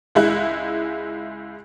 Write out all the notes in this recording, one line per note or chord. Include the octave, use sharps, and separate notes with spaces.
C#2 G#3 E4 F#6